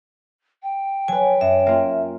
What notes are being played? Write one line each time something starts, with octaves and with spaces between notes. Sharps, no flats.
G5
F#3 B4 G#5
F#2 E5
A#3 F4